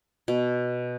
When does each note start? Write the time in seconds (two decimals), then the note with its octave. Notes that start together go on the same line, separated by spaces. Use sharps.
0.28 B2